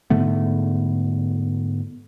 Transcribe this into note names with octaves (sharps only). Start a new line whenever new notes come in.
G#2 D3 A3 B3